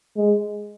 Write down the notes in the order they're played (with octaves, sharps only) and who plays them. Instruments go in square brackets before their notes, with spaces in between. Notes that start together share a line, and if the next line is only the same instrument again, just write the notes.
[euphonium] G#3